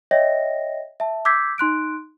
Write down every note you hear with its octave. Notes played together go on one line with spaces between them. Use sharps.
C#5 D#5 E5 G5 A#6
E5 A5
D6 E6 G6 G#6 B6 C7
D#4 C6 F#6 D7